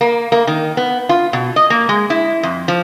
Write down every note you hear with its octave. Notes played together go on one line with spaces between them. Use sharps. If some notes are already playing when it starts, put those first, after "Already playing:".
A#3
A#3
D#3
B3
F4
B2
D#5
A#3
G#3
E4
F2
F3